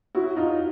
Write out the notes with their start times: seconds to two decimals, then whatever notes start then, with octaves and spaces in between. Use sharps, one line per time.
0.15 E4 F#4
0.36 D#4 F4